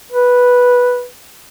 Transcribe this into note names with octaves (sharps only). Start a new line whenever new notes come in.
B4